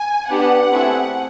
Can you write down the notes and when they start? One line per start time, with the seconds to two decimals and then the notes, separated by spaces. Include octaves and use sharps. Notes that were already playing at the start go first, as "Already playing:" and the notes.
Already playing: G#5
0.29 B3 D4 G4 F#5
0.71 A3 C4 E4 G#4